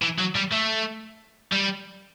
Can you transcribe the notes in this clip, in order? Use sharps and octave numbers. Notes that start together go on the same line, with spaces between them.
E3
F#3
G3
A3
G3